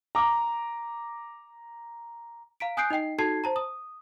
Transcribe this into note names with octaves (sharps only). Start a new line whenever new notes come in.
A#5 D6
F5 A#5 B6 D7
G#5 D#6 F#6 G6 C7 D7
D#4 D#5 G5 C7
D#4 F#4 A4 A5 G#6 C7
C5 A5 A#5
D#6